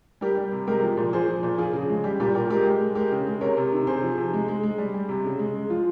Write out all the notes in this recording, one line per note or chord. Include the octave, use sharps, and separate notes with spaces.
G3 G4 A#4
G3
C3
G#3 G4 A#4
F3
A#2
F3 G#4 C5
F3
A#2
F3 F4 G#4
C#3
G#3
G3 G4
A#2 G4
A#2 G4 A#4
G#3 G4 A#4
G#3
G#3
G#3 G4 A#4
C#3
G#3
C3 A#4 C#5
C3
D#3
C3 G#4 C5
F3
C3
G#3
G#3
G#3
G3
G3
C3
C#3
G#3
G#3
F3 F4